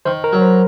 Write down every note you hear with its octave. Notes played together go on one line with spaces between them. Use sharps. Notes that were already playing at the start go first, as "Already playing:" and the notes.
D#3 C5
A#4
F#3
C5